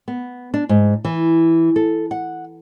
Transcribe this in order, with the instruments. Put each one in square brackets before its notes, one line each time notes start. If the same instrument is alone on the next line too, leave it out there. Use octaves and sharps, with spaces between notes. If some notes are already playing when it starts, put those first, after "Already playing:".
[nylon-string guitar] B3
D4
G#2
E3
A4
F#5